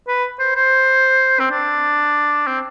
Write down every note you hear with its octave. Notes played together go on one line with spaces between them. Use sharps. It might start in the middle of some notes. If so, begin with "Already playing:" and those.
B4
C5
C5
C4
D4
C4